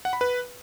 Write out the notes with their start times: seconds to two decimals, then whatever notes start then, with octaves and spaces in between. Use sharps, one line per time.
0.05 F#5
0.13 B5
0.21 B4